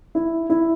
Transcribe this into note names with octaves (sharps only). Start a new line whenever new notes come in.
E4
E4